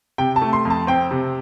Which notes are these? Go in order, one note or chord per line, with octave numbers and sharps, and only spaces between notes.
C3 G5
A5
A3
C6
F2
A5
C4 G5
C3